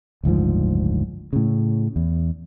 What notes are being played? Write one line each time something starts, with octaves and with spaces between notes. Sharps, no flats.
F#1 D2 G#2 F3
A2 C#3
E2